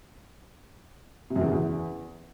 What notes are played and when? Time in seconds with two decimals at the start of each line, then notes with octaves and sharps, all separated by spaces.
1.30 C3
1.36 F#2
1.41 E2
1.46 C#3
1.52 E2